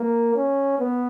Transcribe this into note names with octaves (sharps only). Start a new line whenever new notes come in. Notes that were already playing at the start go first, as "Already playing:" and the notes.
Already playing: A#3
C#4
B3